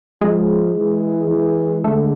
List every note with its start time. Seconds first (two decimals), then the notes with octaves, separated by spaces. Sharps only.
0.21 F3 G#3 G#4
0.76 E3
1.30 E3
1.84 D3 A3 A4